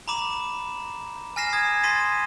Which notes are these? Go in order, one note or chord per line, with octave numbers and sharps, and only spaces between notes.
A#5 B5 D6 E7
G#5 F6 A#6 C7 E7
D#6 G#6
C6 A6 B6 D#7